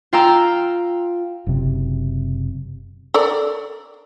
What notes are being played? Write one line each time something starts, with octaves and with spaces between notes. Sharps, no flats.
F4 F5 G5 A#5 E6
F#1 C3
A4 A#4 D5